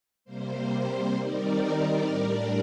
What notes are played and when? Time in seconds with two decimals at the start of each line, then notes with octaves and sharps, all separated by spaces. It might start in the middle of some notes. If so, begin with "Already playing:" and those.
0.25 C3 G3 A#3 C5
0.70 C5
1.16 D#3 G3 C4 D#4 A#4 D5
2.07 A2 G3 D4